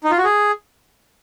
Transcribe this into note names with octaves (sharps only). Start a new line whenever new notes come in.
D#4
F4
F#4
G#4